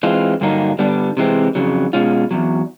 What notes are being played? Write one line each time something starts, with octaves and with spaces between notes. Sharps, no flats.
E3 G#3 C4 F4
G2 D3 F#3 A#3 D#4
G2 D3 G3 B3 D4
C3 E3 G#3 C4
F2 C#3 F#3
B2 G#3 C#4 F4
E2 B2 F#3